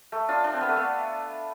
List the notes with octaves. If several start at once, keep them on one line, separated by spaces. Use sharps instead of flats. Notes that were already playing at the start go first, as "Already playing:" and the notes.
A3
D4 F4
D4
C4
B3
A3
B3